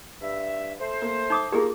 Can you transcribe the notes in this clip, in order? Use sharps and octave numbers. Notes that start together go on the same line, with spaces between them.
G2 E5
A3 C5
A#3
D#4 D6 D#6 G6
A#3 F4 G4 G#4 A#4